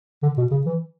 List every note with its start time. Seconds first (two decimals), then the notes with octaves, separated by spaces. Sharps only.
0.23 D3
0.37 B2
0.51 C#3
0.66 E3